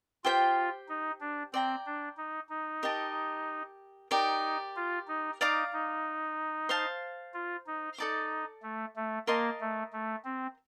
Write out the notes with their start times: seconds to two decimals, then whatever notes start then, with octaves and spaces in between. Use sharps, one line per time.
0.24 F4 G4 C5 G5
0.89 D#4
1.20 D4
1.53 C4 D5 G5 A#5
1.86 D4
2.17 D#4
2.49 D#4
2.83 G4 A#4 D#5 A5
4.11 D#4 G4 A#4 D5
4.76 F4
5.08 D#4
5.41 D#4 D5 F5 A#5 D6
5.73 D#4
6.69 C5 F5 A5
7.34 F4
7.67 D#4
7.98 D#4 A4 D5 A5 D6
8.63 A3
8.96 A3
9.27 A#3 A#4 D#5 A5 C6
9.61 A3
9.93 A3
10.24 C4